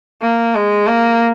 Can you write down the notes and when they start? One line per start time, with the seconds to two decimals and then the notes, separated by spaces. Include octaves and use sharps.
0.22 A#3
0.55 G#3
0.87 A#3